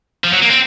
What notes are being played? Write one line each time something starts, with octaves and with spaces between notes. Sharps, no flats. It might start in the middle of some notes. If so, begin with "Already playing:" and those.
F3
F#3
A#3
C4